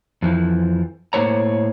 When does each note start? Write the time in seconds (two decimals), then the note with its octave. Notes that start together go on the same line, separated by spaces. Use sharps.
0.22 F2 E3 F3
1.13 A2 A#3 D4 C5 C#5 A#5